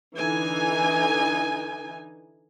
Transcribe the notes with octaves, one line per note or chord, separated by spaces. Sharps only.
D3 E3 D#4 G#5